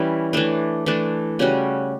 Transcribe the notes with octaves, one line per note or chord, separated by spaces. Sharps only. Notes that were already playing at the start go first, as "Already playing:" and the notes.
Already playing: E3 G3 C#4 E4
E3 A3 D4
E3 A3 D4
C#3 G3 C#4 F#4